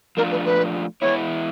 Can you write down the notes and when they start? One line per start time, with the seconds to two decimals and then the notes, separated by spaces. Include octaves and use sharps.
0.17 F3 A3 D4 F4 A#4
0.31 B4
0.45 B4
1.01 E3 G#3 B3 E4 C#5